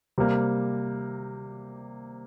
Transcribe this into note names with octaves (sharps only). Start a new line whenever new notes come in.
C3 G3 A#3